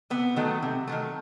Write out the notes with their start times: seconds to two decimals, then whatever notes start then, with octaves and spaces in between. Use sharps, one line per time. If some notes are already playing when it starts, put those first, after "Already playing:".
0.10 C3 B3
0.36 D#3 F#3 A3
0.62 C3
0.87 D#3 F#3 A3